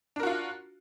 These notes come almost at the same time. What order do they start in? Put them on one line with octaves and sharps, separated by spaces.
D4 A#4 F#4 F4